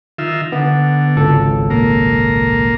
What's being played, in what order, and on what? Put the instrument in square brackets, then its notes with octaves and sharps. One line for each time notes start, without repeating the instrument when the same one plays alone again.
[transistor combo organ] D#3 F4 E5
[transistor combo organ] D3 [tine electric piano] B3
[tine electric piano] G#1 C#2 A4
[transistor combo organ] A#2 A#3